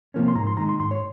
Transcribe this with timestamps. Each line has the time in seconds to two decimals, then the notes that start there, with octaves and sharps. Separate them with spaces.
0.14 C3 F3 A#3 C#4
0.28 C6
0.35 G#2 A#5
0.47 C6
0.57 D#3 G#3 A#5
0.69 C6
0.80 G#2 C6
0.91 C#5